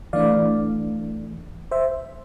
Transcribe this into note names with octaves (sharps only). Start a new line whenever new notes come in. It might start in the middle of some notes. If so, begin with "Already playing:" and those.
E3 A3 D4 D5 F5
C5 E5